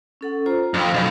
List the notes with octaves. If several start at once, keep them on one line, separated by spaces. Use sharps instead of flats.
C#4 A4 F#5
F4 C5 A#5
F2 F5
B1